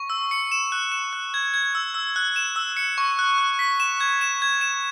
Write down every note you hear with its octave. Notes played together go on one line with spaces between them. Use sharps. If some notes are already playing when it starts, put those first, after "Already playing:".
Already playing: C#6
E6
C#7
E7
F#6
E7
F#6
G#6
G#6
E6
E6
F#6
E7
E6
C#7
C#6
F#6
F#6
B6
E7
G#6
E7
G#6
E7